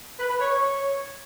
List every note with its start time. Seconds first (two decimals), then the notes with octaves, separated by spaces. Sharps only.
0.19 B4
0.30 B4
0.40 C#5
0.51 C#5